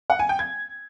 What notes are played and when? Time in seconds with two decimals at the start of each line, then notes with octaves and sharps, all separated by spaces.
0.10 F#5
0.19 G#5
0.29 G5
0.39 G#6